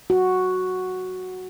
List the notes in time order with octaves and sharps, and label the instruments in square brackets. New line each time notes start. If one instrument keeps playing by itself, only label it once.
[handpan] F#4